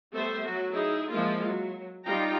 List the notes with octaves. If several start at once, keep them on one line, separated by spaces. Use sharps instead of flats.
G3 A3 B3 A4 C5 E5
F#3 F#4
D#4 E4 G#4
F3 G#3 A#3 E4 F4
F#3
G3 D#4 F4 G5 A#5